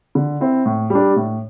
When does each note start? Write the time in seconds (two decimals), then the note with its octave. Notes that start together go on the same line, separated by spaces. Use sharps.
0.15 D3
0.40 C4 E4
0.66 A2
0.90 G3 D4
1.16 A2